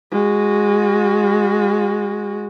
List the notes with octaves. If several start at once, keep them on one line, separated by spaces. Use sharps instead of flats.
G#3 F#4